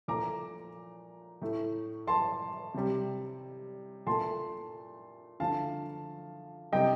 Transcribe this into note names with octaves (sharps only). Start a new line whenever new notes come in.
A#2 F3 A3 A#5 D6
A2 A3
A5 C6
C3 G3
A#2 A3 A5 C6
D3 F3 A3 F5 A5
C3 G3 D#5 G5